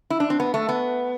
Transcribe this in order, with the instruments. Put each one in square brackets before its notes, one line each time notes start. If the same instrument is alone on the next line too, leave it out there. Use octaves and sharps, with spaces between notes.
[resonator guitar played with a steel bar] E4
D4
C4
B3
A3
B3